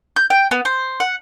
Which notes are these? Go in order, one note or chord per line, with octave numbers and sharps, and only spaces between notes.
G6
G5
B3
C5
F#5